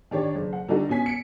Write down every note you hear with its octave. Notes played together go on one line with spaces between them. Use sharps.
D#3 D4 G4 C#5 D5
F#1
F#5
D3 G3 D4 D#4 F#4 A4
B2 C#4 G#5 B6
C#7 D7